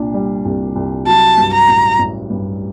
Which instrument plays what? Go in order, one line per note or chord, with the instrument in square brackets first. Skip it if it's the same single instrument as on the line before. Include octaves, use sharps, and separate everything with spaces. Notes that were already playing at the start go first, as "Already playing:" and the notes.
Already playing: [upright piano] C2 A#2 D4
G3
C2
C2
[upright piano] F#3 [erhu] A5
[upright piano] G2
[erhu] A#5
[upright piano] A1
A1
G2